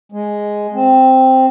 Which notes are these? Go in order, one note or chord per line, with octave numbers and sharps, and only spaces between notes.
G#3
C4